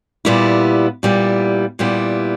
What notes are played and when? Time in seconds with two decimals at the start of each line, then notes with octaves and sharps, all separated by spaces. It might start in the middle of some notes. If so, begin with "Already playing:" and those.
0.25 A#2 G3 B3 E4
1.03 A#2 G3 B3 E4
1.79 A#2 G3 B3 E4